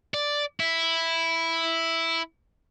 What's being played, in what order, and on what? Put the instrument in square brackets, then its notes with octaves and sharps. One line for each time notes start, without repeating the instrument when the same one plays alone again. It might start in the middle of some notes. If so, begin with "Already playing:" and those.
[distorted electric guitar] D5
E4